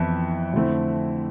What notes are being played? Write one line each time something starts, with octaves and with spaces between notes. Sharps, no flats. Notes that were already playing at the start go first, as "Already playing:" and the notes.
Already playing: F2 E3 B3 E5
F2 D3 A3 C4 E4